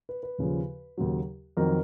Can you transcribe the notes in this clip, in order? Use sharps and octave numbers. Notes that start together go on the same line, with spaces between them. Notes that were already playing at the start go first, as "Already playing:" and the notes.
B4
B4
D#2 C#3 F3
D#2 C#3 F#3
F2 D#3 F#3 A#4